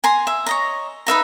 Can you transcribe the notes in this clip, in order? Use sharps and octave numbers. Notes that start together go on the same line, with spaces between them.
G#5 A#5 C6
E5
C#5 D#5 A#5
D#4 B4 E5 A#5